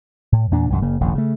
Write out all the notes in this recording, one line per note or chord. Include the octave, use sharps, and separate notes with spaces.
A2
E2 A#2 D4
C2 F#2 D#3
F#1 C#3 A#3
E1 A1 F2 D3
C#3 A3